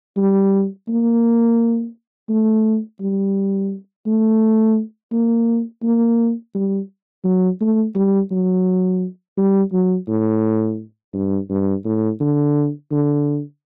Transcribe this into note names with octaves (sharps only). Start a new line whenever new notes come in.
G3
A#3
A3
G3
A3
A#3
A#3
G3
F#3
A3
G3
F#3
G3
F#3
A2
G2
G2
A2
D3
D3